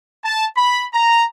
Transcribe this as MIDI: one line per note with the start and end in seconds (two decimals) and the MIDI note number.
0.25 0.46 81
0.56 0.84 83
0.94 1.24 82